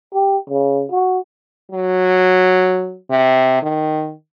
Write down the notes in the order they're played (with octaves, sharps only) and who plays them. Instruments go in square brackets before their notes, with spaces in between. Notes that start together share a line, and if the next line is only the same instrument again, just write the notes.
[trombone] G4
C#3
F#4
[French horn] F#3
C3
D#3